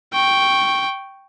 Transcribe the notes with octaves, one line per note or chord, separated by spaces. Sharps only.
G5 C#6